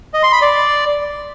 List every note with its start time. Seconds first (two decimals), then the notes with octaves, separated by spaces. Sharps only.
0.14 D#5
0.23 C6
0.32 B5
0.42 D5